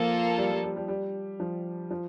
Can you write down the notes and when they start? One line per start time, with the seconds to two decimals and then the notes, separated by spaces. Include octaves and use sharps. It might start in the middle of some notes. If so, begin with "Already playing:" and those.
Already playing: F3 A#3 F4 A4
0.38 G3
0.51 G3
0.63 G3
0.76 G3
0.88 G3
1.40 F3
1.91 F3